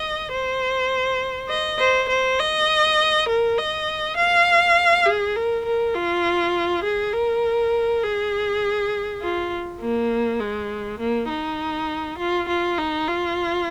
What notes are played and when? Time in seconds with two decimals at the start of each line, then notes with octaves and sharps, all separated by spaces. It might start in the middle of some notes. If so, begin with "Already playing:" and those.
Already playing: D#5
0.32 C5
1.49 D#5
1.80 C5
2.09 C5
2.39 D#5
3.28 A#4
3.58 D#5
4.16 F5
5.06 G#4
5.35 A#4
5.65 A#4
5.94 F4
6.84 G#4
7.13 A#4
8.03 G#4
9.22 F4
9.81 A#3
10.40 G#3
10.99 A#3
11.29 D#4
12.18 F4
12.48 F4
12.78 D#4
13.08 F4